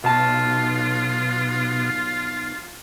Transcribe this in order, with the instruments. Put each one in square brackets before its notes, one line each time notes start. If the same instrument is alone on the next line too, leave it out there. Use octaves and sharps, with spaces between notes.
[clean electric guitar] B1 A5 [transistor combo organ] B2 [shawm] F4